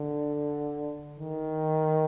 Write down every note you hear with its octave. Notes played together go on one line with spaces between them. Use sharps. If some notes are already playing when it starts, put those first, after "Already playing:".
Already playing: D3
D#3